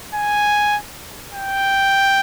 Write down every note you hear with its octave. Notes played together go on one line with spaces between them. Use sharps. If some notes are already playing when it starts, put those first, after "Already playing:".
G#5
G5